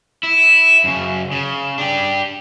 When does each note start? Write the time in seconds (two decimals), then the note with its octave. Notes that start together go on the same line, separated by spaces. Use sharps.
0.23 E4
0.84 F#2 C#3
1.32 C#3
1.78 D4 G4